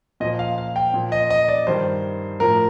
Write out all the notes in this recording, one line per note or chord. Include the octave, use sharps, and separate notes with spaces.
A#2 F3 D#5
F5
F5
G5
A#2 F3
D#5
D#5
D5
G2 D#3 C5
A2 F3 A#4